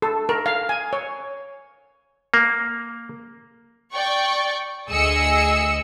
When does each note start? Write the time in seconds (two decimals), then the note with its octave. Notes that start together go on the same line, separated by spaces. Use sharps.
0.02 A4
0.29 A#4
0.46 F5
0.69 G#5
0.93 C#5
2.34 A#3
3.94 D5 G5 C#6
4.90 D2 G#4 D#5 E6 C#7